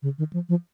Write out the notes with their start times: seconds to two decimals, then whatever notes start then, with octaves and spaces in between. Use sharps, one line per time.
0.02 C#3
0.18 D#3
0.33 F3
0.49 F3